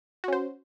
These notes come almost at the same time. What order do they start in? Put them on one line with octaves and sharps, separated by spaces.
F#4 C#4 C5